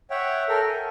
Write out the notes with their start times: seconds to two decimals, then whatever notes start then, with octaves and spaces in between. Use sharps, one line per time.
0.11 C#5 E5 F#5 G5
0.49 A4 A#4 G5
0.68 G#5